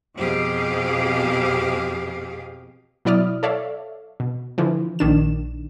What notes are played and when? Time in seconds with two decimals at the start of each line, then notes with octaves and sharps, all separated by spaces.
0.15 F2 B2 G4 G#4 F5
3.05 B2 F#3 E4 D5 D#6 F6
3.43 A4 C#5 D5 E5 F5
4.20 B2
4.58 D3 E3 F3
4.99 A#1 D#3 D4 E7